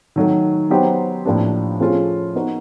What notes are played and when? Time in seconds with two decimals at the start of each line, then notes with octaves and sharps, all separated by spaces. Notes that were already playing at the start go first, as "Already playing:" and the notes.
0.16 D#3 F#3 A3
0.70 F#3 B3 D#4 G4 C5
1.25 A2 F3 A#3 D4 G4
1.80 F3 A3 C#4 F4 G#4
2.35 B3 D#4 F#4 A#4